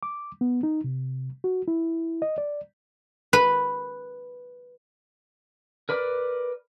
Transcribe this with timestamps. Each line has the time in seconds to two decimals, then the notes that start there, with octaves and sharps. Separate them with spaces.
0.03 D6
0.41 B3
0.63 D#4
0.84 C3
1.44 F#4
1.68 E4
2.22 D#5
2.38 D5
3.33 B4
5.89 A#4 B4 D5